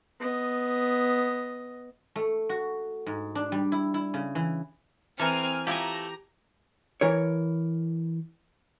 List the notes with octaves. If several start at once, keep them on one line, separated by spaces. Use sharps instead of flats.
B3 D#5
A3
F#4
G#2
D4
G3
E4
E4
C#3
E3
E3 C4 A4 A#4 G#5 F6
F3 A3 E4 G4 G#5 A#5
E3 A#4 C#5